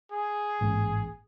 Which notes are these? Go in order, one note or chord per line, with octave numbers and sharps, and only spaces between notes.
G#4
A1 G#2 A#3